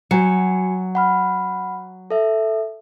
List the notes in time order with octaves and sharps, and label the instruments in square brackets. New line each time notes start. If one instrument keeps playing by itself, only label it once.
[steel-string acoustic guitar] F#3 [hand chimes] F#4 G#5 C#7
[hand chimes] F#5 B5 F6
A4 E5